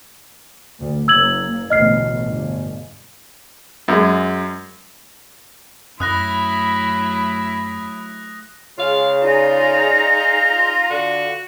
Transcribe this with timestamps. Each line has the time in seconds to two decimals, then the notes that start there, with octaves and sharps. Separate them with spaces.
0.80 D2
1.08 F#1 A#3 E6 G#6 F#7
1.70 A1 D2 B2 D#5 F6 C7
2.27 G1
3.88 F#2 G#3
6.00 F#2 F#3 A3 E4 B5 D#6 F#6 A#6
8.78 C#3 G#3 F4 F5
9.22 D#4 F4 G#4 D5 A#5
10.90 D3 F#4